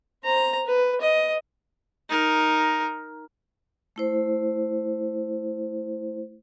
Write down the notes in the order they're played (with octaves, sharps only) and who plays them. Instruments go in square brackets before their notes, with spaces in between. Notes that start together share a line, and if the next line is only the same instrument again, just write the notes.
[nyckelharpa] C5 A#5
B4
D#5
D#4 A#4
[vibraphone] A3 E4 C5